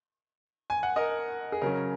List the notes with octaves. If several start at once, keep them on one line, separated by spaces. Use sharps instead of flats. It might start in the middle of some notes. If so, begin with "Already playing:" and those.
G#5
F#5
A#4 D#5
G#4
C#3 F#3 C#4 A#4